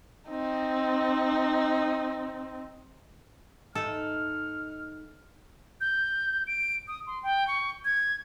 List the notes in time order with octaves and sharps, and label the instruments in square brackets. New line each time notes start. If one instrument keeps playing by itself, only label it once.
[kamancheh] C4 D#4
[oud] G#2 D#4 E5 [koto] A4 [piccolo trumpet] F6
[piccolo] G6
D7
D#6
C6
G5
C#6
G#6